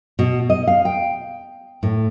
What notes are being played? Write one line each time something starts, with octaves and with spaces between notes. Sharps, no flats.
B2
D#5
F5
G5
A2